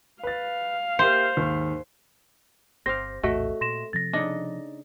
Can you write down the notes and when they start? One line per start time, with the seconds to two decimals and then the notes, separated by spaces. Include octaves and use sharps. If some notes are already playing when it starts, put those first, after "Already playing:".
0.23 B4 F5 A6
0.99 A#3 G4 C5 E5
1.37 D#2 G#2
2.86 G1 C4 G4 C5 F5 A#6
3.23 A#1 E2 A2 A3 F#4 D#5 E5
3.61 A#2 C6 A#6 E7
3.93 C3 F3 C4 A6 A#6
4.13 C#3 D4 D#4 D#5